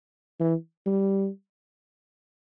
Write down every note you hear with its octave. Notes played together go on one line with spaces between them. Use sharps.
E3
G3